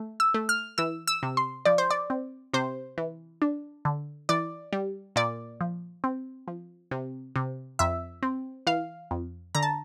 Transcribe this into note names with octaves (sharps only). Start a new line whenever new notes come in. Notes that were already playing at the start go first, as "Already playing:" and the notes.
Already playing: A3
E6
A3
F6
E3 E6
E6
C3
C6
F3 D5
C5
D5
C4
C3 C5
E3
D4
D3
E3 D5
G3
A#2 D5
F3
C4
F3
C3
C3
F2 E5
C4
E3 F5
F2
D3 A#5
A5